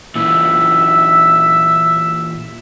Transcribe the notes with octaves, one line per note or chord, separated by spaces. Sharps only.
A#2 E3 E5